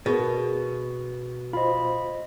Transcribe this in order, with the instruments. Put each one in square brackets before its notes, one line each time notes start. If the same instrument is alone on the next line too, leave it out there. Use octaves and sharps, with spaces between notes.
[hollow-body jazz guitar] B2 [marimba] G#4 A#4
[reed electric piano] F4 C5 [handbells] D#5 B5